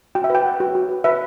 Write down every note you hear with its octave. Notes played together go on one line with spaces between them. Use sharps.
F#4 G5
E5
B4 G5
B4 F#5
F#4
F#4
B4
B4 E5